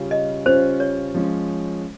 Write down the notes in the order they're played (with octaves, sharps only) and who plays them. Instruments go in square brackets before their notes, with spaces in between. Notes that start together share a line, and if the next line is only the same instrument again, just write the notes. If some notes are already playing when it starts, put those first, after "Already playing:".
Already playing: [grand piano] C#3 G3 C#4 F4
[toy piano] D#5
[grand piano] C#3 G3 C#4 F4 [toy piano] C5
[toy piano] C#5
[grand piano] F3 G#3 C#4